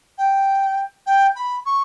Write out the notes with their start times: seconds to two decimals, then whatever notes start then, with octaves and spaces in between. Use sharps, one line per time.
0.18 G5
1.06 G5
1.35 B5
1.65 C#6